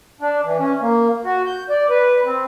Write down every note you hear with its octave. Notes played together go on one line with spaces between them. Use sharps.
D4
E3
C#4
A#3
F#4
G6
D5
B4
C4